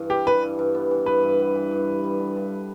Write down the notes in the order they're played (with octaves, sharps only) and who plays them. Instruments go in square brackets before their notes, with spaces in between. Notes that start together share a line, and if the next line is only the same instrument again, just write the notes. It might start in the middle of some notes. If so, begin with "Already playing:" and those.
Already playing: [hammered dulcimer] G2 E3
[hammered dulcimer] G3 [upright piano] G4
[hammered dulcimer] E3 [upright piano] B4
[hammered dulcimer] G2
G2
B3
E3
[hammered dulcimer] G2 [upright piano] B4
[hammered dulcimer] G2
B3
E3
G2
G2
G3
D3
G2